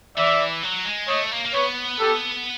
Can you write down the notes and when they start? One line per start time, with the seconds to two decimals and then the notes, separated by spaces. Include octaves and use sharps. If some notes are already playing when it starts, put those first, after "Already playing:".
0.17 E3 D5 E5
0.63 F#3
0.85 G#3
1.07 A3 C#5 D#5
1.31 A#3
1.45 A#3
1.53 B3 B4 C#5
1.99 G4 A4